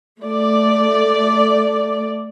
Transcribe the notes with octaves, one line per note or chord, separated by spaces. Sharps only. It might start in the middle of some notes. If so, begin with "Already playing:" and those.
A3 D5